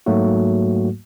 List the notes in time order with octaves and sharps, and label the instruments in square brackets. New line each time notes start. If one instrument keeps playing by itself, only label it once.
[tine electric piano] G#2 F#3 A3 A#3 F#4